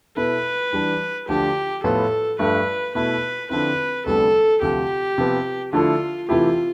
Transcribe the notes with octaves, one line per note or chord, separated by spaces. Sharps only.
B2 B3 E4 A4 B4
E3 G3 D4
D2 D3 F3 G4
A2 F3 B3 F4 A4
G2 F3 A3 B4
B2 A3 E4 B4
D3 F3 C4 E4 B4
D2 C3 G3 B3 D4 A4
D2 C3 F3 G4
C3 F3 B3
D3 F3 A3 E4 F4 A4
C3 E3 A3 E4 F4 G4